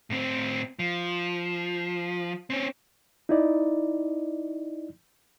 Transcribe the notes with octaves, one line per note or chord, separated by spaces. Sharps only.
A2 C4
F3
C4 C#4
D#4 E4 D5 D#5